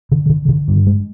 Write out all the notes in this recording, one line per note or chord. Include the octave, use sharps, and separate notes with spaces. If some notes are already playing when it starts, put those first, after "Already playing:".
D3
D3
D3
G2
G#3